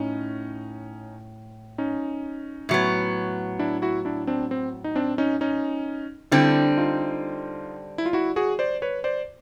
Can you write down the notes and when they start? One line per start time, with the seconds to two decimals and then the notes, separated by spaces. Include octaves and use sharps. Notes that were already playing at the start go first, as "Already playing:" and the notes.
Already playing: A2 C#4 D#4
1.78 C#4 D#4
2.69 A2 F#3 B3
3.59 D4 E4
3.82 E4 F#4
4.05 D4 E4
4.27 C4 D4
4.51 C4
4.84 D#4
4.96 C4 D4
5.18 C#4 D#4
5.41 C#4 D#4
6.31 D3 G3 C4 D4 E4
6.77 D#4 F4
7.98 E4
8.06 F4
8.13 E4 F#4
8.36 F#4 G#4
8.59 C5 D5
8.82 B4 C#5
9.04 C5 D5